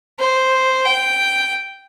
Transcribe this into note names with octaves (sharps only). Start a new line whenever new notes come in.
C5
G5